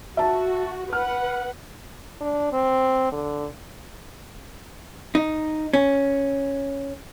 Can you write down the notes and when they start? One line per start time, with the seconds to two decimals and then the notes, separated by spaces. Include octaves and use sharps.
0.17 F#4 E5 A5
0.93 B4 F#5 F6
2.21 D4
2.53 C4
3.12 D3
5.15 D#4
5.73 C#4